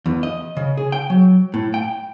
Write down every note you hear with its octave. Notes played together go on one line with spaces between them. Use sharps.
E2
D#5
C#3
G#4
G5
F#3
A2
G5